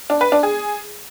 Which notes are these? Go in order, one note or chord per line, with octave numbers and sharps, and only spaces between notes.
D4
B4
D4
G#4